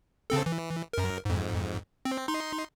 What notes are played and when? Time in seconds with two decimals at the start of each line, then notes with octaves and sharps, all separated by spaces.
0.30 C#3 C4 A4
0.46 E3
0.93 F#2 A#4
1.25 F2 G#2
2.05 C4
2.28 D#4 C6